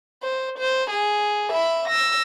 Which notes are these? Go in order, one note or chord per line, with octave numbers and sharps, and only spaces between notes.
C5
C5
G#4
E5 B5
E6 A#6